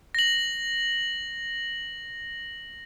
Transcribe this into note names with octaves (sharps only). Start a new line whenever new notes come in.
A#6 F#7